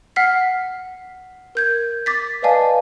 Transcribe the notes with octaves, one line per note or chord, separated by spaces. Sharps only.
F#5 F6 B6 C7
A#4 G6 G#6
D6 A6 B6
B4 D5 D#5 F5 G#5 A5